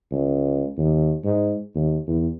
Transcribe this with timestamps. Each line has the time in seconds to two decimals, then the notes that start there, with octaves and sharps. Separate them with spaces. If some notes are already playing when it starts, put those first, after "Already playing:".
0.11 C#2
0.78 D#2
1.24 G#2
1.75 D#2
2.08 E2